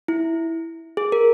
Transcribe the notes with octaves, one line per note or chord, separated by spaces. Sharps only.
E4
G#4
A#4